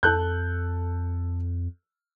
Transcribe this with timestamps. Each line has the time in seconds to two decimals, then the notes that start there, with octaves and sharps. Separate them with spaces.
0.03 F2 A4 F#6 G6